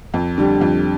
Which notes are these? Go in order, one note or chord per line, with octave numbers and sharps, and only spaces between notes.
F2
D3 G3
F2